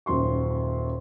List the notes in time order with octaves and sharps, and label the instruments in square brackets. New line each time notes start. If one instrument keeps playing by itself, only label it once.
[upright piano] D#1 F#2 C6 C#6